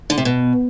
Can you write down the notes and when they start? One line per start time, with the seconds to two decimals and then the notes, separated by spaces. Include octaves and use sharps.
0.10 D3
0.18 C3
0.25 B2